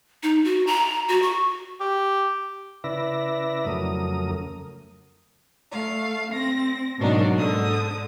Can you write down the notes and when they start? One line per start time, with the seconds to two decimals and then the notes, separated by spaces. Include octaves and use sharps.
0.23 D#4
0.45 F#4
0.67 A#5
1.08 F#4
1.22 C#6
1.80 G4
2.84 C#3 E4 B4 D5 E5 A#6
3.66 F2 C#3 F#3 A3 A#4 D#6
5.72 A3 F5
6.33 C4 A#6
6.97 G#2 B2 F#3 A#3 D4 D#4
7.36 G#2 D3 D#6